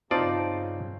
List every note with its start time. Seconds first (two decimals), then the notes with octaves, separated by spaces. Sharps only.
0.11 G2 C#3 C4 D#4 F4 D5 A5